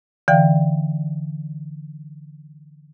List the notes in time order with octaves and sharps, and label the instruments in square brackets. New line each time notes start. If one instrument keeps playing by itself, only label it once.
[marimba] D3 E3 D5 F5 G5